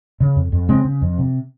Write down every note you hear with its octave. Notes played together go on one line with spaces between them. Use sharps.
C#3
F2
F2
C#3 G#3 C4
C#3
F2
C3